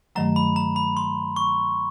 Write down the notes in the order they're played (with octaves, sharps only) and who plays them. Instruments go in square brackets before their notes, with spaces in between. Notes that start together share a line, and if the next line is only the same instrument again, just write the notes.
[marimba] G2 D#3 F#3 A3 [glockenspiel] A#5
[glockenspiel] B5
A#5
B5
C6
C#6